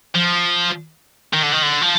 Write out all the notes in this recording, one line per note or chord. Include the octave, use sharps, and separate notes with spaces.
F3
D#3
D3
D#3
D3
F3